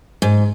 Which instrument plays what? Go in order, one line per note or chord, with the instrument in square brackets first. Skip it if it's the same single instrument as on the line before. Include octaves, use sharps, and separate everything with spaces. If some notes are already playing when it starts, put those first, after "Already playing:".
[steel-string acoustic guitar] G#2